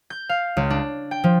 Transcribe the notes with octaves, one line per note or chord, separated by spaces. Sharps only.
G6
F5
C#2
D4
G5
F3